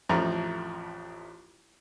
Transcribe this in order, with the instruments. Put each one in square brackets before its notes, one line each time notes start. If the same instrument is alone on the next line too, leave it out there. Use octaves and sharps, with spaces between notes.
[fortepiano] A1 F2 F3 A3 A#5